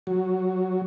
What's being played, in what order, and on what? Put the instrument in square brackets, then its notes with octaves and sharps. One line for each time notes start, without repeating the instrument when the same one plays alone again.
[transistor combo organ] F#3